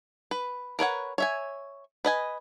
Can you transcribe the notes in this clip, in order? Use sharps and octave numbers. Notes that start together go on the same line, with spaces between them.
B4
A#4 B4 C#5 F#5
C#5 E5 G#5
B4 D#5 G#5